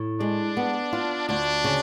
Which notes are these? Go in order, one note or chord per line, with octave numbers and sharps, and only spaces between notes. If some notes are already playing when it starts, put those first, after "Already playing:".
Already playing: A2
G#3 D4
B3
F4
D2 D4
C#3